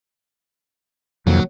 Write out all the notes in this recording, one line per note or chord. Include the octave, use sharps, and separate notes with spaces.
F2 C3 D#3 F#3 A#3